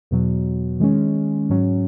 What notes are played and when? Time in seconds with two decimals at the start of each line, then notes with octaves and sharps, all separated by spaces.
0.11 E2 B2 F#3
0.80 D#3 G#3 C#4
1.50 G#2 F#3 C#4